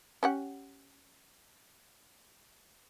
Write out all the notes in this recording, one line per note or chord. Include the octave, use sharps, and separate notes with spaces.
C#4 G4 F#5